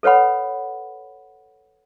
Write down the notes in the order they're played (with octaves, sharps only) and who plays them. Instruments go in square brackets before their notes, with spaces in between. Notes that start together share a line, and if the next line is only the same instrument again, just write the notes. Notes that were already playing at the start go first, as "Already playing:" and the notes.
[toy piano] A4 B4 C#5 F#5 B5